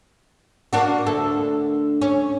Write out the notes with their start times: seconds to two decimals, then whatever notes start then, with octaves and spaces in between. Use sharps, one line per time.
0.73 A#3 D4 F#4
1.06 D2 A4
2.02 C#4